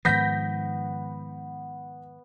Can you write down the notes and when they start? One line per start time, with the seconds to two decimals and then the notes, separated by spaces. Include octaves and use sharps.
0.05 G#2 D#3 F3 B3 G6 A#6 B6